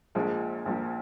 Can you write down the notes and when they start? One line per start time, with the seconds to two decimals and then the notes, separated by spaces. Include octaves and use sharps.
0.15 A#1 A#2 F3 G#3
0.66 A#1 A#2 F3